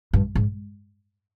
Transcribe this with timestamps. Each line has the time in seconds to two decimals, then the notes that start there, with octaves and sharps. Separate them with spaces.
0.13 G2
0.35 G#2